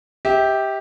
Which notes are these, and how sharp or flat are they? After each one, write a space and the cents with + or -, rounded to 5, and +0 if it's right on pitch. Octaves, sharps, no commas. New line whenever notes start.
G4 +0 E5 -35